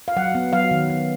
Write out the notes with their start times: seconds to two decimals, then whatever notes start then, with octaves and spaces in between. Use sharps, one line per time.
0.08 F5
0.16 F#3 F#5
0.35 B3
0.53 F#3 F5
0.71 D#3
0.90 B3